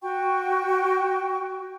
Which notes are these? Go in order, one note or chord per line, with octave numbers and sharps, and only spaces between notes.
F#4 G5 C#6